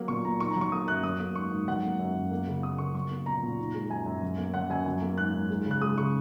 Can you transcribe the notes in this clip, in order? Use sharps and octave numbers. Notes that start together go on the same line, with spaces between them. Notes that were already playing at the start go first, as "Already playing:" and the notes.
Already playing: F#3 A#3
A#2 C#6
A#2 A#5
D#3 C#6
A#5
F#3 C#6
A#3 D#6
F#2 F#6
F#3 D#6
A#3
G#2 C#6
G#2
F#3 F#5
A#3
F#2
F#2
A#3
C#3
A#3 D#6
C#3 C#6
F#3 C#6
A#3
A#2 A#5
A#2
D#3
G#3
F#2 G#5
F#2
F#3
A#3
F#2 F#5
F#2 G#5
F#3 G#5
A#3
G#2 F#6
G#2
G#3
C#3
F#6
G#3 D#6
C#3 C#6